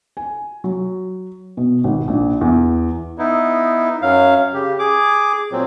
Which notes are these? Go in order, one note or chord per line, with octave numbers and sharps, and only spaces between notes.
G#5
F#3
B2
G#1
A#1
E2
B3 D#4 E4
F#2 F#3 F5
C#3 G4
G#4 D6
A#2 F#3 C4